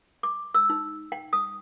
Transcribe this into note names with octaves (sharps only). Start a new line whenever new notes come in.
D6
E6
D#4
G5
D#6